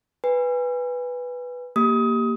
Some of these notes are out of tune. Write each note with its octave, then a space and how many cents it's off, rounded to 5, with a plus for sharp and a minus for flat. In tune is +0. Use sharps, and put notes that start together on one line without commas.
B4 +0 G#5 -30
A#3 +0 G4 +0 D#6 +25